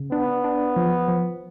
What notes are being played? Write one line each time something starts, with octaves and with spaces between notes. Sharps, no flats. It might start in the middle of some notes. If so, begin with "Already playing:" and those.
Already playing: C#3
B3 D4
D4
F3
F3